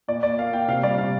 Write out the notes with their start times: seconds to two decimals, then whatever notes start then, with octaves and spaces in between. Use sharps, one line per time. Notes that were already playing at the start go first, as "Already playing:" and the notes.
0.08 A#2 D5
0.23 A#3 D5
0.38 A#3 F5
0.53 A#2 G5
0.68 C3 F5
0.83 G3 D5
0.98 C3 F5